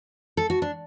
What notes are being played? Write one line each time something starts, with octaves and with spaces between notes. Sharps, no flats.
A4
F#4
D4